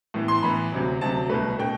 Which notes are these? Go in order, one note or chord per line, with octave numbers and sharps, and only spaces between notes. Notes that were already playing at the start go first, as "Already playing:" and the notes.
A2 E3 B3
C6
A2 E3 B3 B5
D2 C3 F#3
D2 C3 F#3 A5
C2 B2 A3 B4
B2 A3 G5